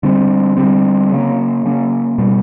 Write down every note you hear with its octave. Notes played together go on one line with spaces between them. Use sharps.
D3 G3 C4
D3 G3 C4
C#3 F#3 A#3 C#4
C#3 F#3 A#3 C#4
B2 G3